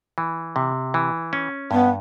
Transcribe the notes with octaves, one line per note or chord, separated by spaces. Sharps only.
E3
C3
E3
C#4
G2 B3